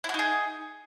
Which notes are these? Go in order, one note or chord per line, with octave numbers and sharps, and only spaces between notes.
D#4 E4 F#4 G#4